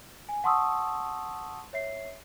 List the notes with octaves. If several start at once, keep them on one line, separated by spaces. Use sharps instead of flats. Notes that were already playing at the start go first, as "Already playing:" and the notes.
G#5
F#5 A5 C6 C#6 D#6 E6
C#5 E5 C7